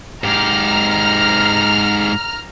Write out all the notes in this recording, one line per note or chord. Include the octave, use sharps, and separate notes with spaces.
G#2 G4 A#5 F6